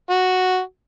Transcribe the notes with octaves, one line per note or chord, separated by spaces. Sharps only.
F#4